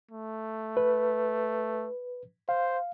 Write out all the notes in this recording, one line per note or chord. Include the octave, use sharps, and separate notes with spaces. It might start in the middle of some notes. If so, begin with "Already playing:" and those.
A3
B4
C5 F5